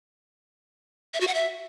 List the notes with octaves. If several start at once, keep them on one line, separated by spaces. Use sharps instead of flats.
E5
F#4
F#5
E5